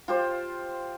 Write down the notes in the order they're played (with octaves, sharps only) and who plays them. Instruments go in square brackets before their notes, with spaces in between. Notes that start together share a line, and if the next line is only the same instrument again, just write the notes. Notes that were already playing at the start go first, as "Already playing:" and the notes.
[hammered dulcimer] F4 G4 C5